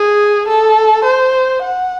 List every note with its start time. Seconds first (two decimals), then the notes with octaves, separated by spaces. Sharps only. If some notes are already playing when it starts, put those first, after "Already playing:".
Already playing: G#4
0.48 A4
1.04 C5
1.62 F#5